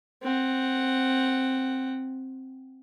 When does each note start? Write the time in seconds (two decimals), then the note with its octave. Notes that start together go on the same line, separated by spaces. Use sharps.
0.23 C4 F#5